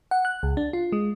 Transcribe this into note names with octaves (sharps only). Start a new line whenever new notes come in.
F#5
F#6
C#2
D4
F4
G#3